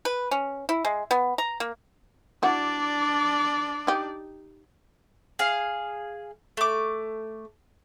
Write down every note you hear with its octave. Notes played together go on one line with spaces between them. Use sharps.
B4
C#4
E4
G#3
B3
A#5
A#3
D4 E4 F#4 D5
D#4 G4
G#4 F5
A3 D6